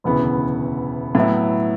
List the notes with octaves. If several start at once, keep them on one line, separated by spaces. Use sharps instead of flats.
E1 D2 C#3 E3 B3
A2 F#3 B3 E4